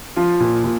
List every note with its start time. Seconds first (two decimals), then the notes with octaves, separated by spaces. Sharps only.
0.16 F3 F4
0.40 A#2
0.64 A#2